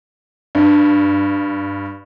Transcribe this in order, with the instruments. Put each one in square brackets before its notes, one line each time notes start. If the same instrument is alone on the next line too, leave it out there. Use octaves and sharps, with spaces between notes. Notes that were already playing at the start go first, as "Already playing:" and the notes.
[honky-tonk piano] G2